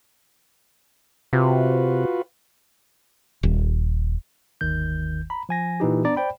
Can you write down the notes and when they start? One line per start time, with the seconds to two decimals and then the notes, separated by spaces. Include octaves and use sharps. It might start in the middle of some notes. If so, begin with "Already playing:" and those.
1.33 C3 F4 F#4 B4
3.43 D#1
4.61 G1 D#2 D#3 G6
5.30 A#5 B5
5.49 F3 G#5 A#6
5.80 A#2 E3 D#4 G4
6.04 B3 D4 D5 A#5
6.16 C5 D5 G5 B5